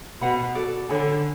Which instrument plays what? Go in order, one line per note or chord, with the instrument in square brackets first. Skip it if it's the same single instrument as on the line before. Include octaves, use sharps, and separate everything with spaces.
[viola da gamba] B2 [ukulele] B4 F#5 B5
[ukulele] F#4 A4 D5
[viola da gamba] D3 [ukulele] A4 C#5 G#5 B5